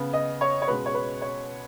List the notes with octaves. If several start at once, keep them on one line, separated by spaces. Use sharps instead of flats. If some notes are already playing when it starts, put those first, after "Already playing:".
Already playing: C#3 B3
D#5
C#5
C#5
B2 G#3 C#4 B4
C#5
B4
C#5